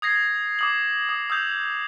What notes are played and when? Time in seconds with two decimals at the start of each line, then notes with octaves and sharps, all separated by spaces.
0.02 D#6 G#6 A#6 C7
0.59 D6 D#6 F#7
1.09 D#6
1.30 D#6 E6 G6 F7